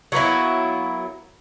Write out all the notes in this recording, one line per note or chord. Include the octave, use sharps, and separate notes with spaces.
F#3 A#3 B3 E4